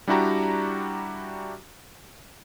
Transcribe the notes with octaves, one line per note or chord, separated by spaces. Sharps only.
G3 D4 E4 F#4 G4 A#5